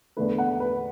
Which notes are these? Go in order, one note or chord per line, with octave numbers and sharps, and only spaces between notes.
E2 D3 A3 B4
F#5
B4